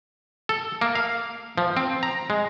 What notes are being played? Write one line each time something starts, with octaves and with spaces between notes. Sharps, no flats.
A4
A#3
F5
F3
C4
A#5
G#3